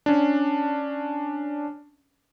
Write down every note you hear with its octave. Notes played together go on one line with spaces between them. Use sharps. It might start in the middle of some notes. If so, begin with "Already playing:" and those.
C#4 D4